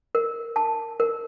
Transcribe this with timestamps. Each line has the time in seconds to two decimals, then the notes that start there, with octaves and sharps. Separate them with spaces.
0.15 A#4
0.56 A5
1.00 A#4